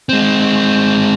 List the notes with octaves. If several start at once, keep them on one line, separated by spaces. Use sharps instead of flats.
G#3 C4